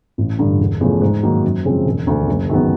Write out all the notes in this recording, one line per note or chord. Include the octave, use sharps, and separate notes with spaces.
A1
G2 D3
E1
E2 C#3 F3 A3
G#2
D#3 F#3 A#3 D#4
F#2
C#3 F3 G#3 C4
E1
D2 D3
F#1
F#2 D#3 G#3 B3